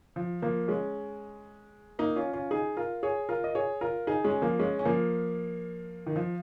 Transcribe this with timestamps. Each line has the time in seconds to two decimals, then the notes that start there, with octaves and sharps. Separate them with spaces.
0.16 F3
0.42 F3 A#3
0.68 G#3 C#4
1.99 A#3 D#4
2.16 C#4 F4
2.33 C#4 F4
2.51 D#4 G#4
2.77 F4 A#4
3.03 G#4 C#5
3.29 F4 A#4
3.44 D#5
3.55 G#4 C#5
3.81 F4 A#4
4.07 D#4 G#4
4.24 G#3 C#4
4.42 F3 A#3
4.59 G#3 C#4
4.79 C#4
4.85 F3 A#3
6.06 D#3
6.16 F3